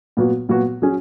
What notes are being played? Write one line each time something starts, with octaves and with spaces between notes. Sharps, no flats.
A#2 F#3 B3 F#4
A#2 F#3 B3 F#4
F#3 C#4 G#4